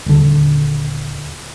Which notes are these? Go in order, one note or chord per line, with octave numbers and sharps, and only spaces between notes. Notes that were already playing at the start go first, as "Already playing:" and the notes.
D#1 D3